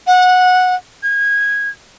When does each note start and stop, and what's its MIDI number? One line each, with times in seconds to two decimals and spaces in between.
0.07 0.75 78
1.03 1.69 92